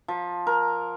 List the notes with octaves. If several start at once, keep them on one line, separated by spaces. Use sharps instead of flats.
F3
A#4